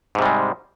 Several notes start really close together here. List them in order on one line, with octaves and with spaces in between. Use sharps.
G#2 C3 G3 G#3